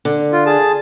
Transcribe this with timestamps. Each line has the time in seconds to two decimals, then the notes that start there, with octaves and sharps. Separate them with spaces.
0.05 D3
0.33 F4
0.46 G#4 A5